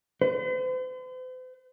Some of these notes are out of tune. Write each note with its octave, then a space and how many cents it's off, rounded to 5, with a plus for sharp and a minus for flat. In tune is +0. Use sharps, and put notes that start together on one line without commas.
C5 -45